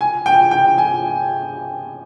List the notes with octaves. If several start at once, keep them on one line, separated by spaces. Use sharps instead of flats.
G#5
G5
G5
G#5